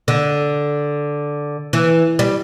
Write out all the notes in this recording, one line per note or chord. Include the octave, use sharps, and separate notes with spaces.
D3
E3
G3